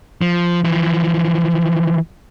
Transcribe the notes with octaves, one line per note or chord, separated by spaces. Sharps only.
F3
E3 F3